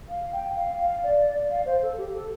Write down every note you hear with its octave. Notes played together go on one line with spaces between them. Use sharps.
F5
G5
F5
F5
D5
F5
C5
A4
G4
A4